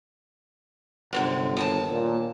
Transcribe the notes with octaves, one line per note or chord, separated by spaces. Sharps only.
G1 F#2 A2 C3
D#2 G#5 A5
A#2